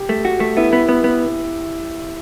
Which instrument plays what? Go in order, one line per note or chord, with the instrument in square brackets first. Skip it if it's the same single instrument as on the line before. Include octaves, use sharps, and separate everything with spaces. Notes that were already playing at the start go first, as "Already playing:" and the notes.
Already playing: [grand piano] G4
[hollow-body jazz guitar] A3
F#4
A3
[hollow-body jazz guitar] B3 [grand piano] E4
[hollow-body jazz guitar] B3
B3
B3